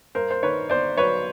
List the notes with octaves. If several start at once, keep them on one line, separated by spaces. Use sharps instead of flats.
G2 A#4 C5
C5
D#3 B4 C#5
G1 C5 D5
F#3 B4 C#5